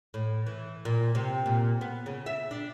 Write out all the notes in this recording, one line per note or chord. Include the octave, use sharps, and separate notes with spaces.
A2
E3
A#2
C3
A#2
B3
C#3
E5
D4